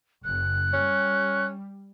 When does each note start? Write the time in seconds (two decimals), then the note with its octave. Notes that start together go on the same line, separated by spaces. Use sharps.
0.24 F#1 F#6
0.73 G3 C#4